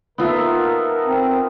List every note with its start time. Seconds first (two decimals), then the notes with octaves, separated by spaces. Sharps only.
0.18 B3 D#4 F4 A4 A#4 E5
1.06 C4